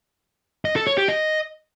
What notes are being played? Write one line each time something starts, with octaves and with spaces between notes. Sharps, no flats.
D#5
A4
C#5
G4
D#5